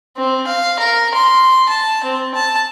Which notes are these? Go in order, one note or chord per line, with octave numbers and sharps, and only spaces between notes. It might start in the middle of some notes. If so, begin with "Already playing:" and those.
C4
F5
A#4
C6
A5
C4
A5